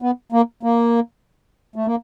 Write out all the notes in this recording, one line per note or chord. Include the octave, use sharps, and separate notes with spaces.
B3
A#3
A#3
A3
A#3